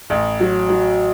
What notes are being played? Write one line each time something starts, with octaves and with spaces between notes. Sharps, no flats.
A1
F#3
F#3